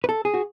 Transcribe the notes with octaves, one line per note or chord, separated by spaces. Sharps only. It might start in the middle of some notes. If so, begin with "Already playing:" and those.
B4
A4
G#4
F#4